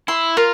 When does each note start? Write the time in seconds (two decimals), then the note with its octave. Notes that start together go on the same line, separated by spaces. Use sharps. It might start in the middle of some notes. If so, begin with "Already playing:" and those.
0.08 E4 C6
0.37 F4 A#4